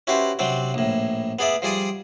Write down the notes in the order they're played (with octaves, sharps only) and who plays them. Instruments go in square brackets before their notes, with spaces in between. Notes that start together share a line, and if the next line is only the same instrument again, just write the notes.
[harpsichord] C#4 E4 F#4 G4 B4 C5
C3 F#3 C4 D4
A#1 A2
B3 G#4 D5 E5
F3 G3 G#4 D5 D#6